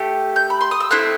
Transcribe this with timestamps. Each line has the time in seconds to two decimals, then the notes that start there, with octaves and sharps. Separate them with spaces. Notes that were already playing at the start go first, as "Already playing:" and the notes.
Already playing: A3 G4
0.36 G6
0.50 B5
0.61 C6
0.71 D#6
0.80 E6
0.91 A3 C4 E4 F#6